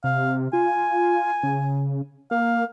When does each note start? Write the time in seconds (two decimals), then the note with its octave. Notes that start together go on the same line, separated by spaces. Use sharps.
0.04 C3 F5
0.53 F4 G#5
1.43 C#3
2.31 A#3 F5